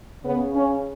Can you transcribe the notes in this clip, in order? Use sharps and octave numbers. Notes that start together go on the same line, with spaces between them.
C#3 B3
C#4